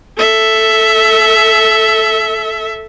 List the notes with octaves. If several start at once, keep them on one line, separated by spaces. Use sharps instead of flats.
A4 E5